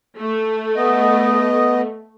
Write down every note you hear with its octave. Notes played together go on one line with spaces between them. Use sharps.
A3
B3 D#5